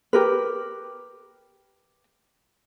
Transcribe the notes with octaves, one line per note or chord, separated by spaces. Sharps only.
G4 A#4 B4